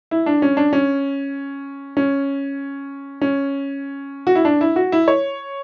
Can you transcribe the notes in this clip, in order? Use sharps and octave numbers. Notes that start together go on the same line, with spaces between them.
E4
D4
C#4
D4
C#4
C#4
C#4
F#4
E4
D4
E4
F#4
E4
C#5